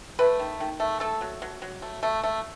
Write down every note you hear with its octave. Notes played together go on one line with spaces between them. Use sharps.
A3 B4
D#3
D#3
A3
A3 A4
F#3
F#3
F#3
A3
A3
A3